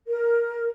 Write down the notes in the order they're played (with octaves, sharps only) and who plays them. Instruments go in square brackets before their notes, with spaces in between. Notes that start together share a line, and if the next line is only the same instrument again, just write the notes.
[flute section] A#4